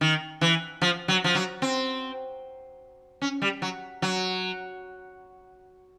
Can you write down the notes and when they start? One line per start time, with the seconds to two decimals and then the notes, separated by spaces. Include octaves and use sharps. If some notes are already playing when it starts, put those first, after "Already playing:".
0.01 D#3
0.41 E3
0.82 F3
1.08 F#3
1.24 F3
1.35 F#3
1.62 C4
3.22 C#4
3.42 G3
3.62 F#3
4.02 F#3